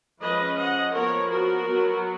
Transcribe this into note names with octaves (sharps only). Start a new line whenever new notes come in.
F3 G#3 C#4 B4 D#5
D#5 F#5
F3 B3 A#4 C#5
F#4 A#4
F#3 B3